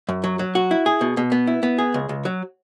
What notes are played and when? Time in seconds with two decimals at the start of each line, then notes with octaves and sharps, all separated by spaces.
0.09 F#2
0.24 F#3
0.39 F#3
0.55 F#4
0.71 E4
0.86 G#4
1.01 B2
1.17 B2
1.32 B3
1.47 E4
1.63 B3
1.78 G#4
1.94 C#2
2.09 C#2
2.25 F#3